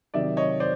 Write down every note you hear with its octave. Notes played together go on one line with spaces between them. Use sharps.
C3 D#3 F#3 D5 E5
C#5 D#5
C5 D5